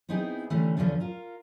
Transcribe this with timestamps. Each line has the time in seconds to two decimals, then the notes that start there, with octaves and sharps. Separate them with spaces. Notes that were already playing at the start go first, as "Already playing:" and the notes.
0.09 B3 C4 D#4 E4 G#4
0.50 D3 E3 G3 A3 C#4
0.77 E2 D3 F3 G3 B3 C#4
1.00 F4 A#4